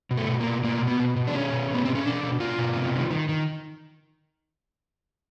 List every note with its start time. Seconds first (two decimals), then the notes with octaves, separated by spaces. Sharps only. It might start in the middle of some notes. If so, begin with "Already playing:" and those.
0.11 B2
0.17 A3
0.29 B2
0.40 A#3
0.46 B2
0.64 B2 A#3
0.81 B2
0.87 B3
0.99 B2
1.16 B2
1.27 D4
1.35 B2 C#4
1.52 B2
1.70 B2 B3
1.85 B2 C4
1.95 C#4
2.05 B2 D4
2.23 B2
2.40 B2 F4
2.58 B2
2.76 C3
2.94 D#3
3.10 D#3
3.29 D#3